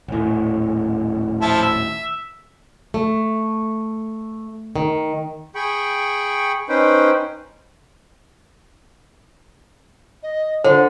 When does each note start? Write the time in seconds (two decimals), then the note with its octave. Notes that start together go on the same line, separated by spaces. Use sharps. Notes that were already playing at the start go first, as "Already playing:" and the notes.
0.08 D#1 A2
1.41 F3 E4 A5
1.62 E5
2.94 A3
4.76 D#3
5.55 G#4 G5 B5 C#6
6.69 C#4 D#4 B4 C5 G5
10.23 D#5
10.64 D3 F4 C5